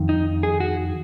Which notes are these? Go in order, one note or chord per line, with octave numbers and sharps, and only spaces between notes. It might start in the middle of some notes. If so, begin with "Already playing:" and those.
Already playing: F2 D#3
D#4
G#4
F#4